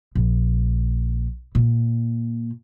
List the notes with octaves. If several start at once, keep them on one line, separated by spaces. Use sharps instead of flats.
A#1
A#2